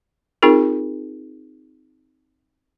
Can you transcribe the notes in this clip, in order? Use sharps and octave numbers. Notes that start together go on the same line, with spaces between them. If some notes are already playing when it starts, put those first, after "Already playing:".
C4 D#4 F4 G#4 A#4